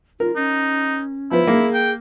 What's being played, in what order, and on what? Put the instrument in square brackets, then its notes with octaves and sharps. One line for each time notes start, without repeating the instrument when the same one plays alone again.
[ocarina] F4 [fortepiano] A#4
[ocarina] C#4 [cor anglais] D#4
[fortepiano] F3 B3 [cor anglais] E4
[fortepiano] A#3 [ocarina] G#4
[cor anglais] G5